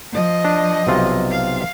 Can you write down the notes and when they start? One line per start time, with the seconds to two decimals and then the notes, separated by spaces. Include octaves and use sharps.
0.12 F3 D#5
0.45 D4
0.87 B1 C3 F4
1.31 F5